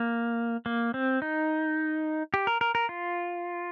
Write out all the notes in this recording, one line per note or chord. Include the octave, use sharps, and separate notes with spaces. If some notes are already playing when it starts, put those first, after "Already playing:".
Already playing: A#3
A#3
C4
D#4
G4
A#4
A#4
A#4
F4